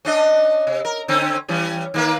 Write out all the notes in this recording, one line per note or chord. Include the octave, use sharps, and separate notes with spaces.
C#4 D4 D#5
C3
A#4
D3 C4 C#4
E3 G3 C#4
D#3 A#3 B4